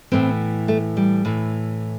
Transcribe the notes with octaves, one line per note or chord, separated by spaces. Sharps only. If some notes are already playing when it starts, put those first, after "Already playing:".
A2 E3 C4
A3
G3
A2 E3